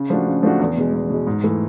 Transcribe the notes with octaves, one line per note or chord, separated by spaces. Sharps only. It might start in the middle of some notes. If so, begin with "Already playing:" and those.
Already playing: C#3
F3 A3 D4 F#4
C#3
F3 A3 D4 F#4
E2
B2 G#3
E2
B2 G#3
G#2
E3 A3